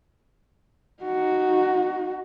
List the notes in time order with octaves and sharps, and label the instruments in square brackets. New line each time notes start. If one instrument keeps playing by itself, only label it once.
[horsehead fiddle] D#4 F#4